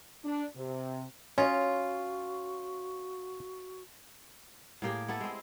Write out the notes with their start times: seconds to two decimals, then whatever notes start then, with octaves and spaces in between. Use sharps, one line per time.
0.25 D4
0.56 C3
1.38 C#4 F4 F#4 C#5 D#5
4.82 A2 A#3 G4 G#4
5.08 B3 E4 A4
5.21 G#3 C4